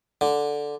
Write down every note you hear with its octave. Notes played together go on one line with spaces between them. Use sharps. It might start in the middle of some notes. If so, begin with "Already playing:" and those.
D3